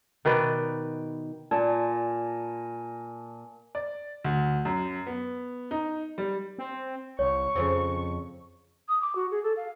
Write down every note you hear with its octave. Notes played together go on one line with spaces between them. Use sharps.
B2 D#3 B4 D5
A#2 A#4 G#5 A5
D5
D2
F#2
B3
D#4
G3
C4
C2 C#5 C#6
F2 C#3 F3 C4
D#6
D6
F#4
G#4
A4
F5